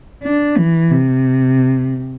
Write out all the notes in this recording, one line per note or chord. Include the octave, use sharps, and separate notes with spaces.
D4
E3
C3